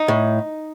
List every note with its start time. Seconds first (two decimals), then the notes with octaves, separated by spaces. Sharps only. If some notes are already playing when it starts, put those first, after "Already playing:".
Already playing: D#4
0.08 A2